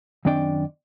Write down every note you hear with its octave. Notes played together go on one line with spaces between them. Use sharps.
F#2 D#3 C4 D4 D5 G5